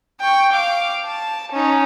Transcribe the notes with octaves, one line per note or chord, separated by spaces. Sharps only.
G5 C#6
F5 D6
A5
C#4 D#4